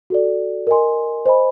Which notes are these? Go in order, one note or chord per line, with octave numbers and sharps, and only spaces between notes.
F#4 A4 D5
A#4 D#5 G#5 C6
C5 D#5 G#5 B5